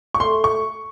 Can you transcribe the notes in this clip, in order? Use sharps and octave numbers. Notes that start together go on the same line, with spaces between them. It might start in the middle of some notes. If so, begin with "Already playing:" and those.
C#6
A3 C6
C#6